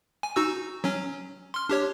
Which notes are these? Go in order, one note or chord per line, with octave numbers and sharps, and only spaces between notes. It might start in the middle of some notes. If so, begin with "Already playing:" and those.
G#5
D#4 F#4 E6
F#3 C#4
C6 F6
D4 G4 C#5